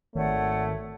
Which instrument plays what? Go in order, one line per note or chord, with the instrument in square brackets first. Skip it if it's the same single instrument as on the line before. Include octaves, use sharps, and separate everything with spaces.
[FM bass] G#1 [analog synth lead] D#3 [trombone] A3 [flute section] C#5 D5 F#5